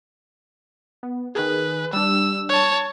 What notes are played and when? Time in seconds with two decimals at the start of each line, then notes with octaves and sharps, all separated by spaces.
1.03 B3
1.35 D#3 G#4 B4
1.93 G3 D4 E6
2.49 C#5 A5